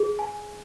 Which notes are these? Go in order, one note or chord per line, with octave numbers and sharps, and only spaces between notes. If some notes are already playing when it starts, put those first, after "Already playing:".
Already playing: G#4
G#5